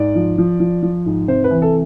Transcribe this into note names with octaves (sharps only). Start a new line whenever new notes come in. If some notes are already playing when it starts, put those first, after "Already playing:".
Already playing: G#2 D5
F3
F3
F3
F3
G#2
C3 C5
B4
E3
A4